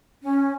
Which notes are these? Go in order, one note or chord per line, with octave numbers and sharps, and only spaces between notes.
C#4